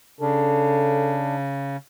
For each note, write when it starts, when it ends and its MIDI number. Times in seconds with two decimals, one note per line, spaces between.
0.20 1.77 49
0.20 1.35 62
0.20 1.21 69